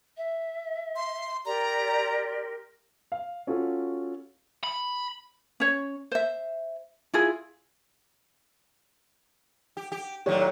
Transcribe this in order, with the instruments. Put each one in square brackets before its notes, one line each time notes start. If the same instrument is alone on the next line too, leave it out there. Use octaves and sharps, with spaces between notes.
[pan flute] E5
[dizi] C6
[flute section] G4 A#4 C6 [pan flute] D5 [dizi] A#5
[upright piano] F5
C#4 F4 F#4 A4
[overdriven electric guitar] B5
[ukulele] C#4 C#5
C5 E5
E4 F4 G#4
[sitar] G4
G4
[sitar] A2 D#3 F#3 [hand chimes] G4 C#5 D5